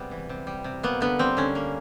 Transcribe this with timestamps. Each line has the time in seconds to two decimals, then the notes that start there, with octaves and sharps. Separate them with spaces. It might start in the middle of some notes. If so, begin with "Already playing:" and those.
Already playing: C3 G3 G#3 B3
0.11 E3
0.29 C3
0.47 G3
0.64 C3
0.83 A#3 B3
1.01 D3 B3
1.19 G3 C4
1.37 D3 C#4
1.55 A#3